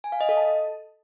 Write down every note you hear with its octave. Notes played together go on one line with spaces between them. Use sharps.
G#5
F5
D#5
A4
A5